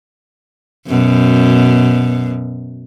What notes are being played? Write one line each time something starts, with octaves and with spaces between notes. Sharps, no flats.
F#2 B2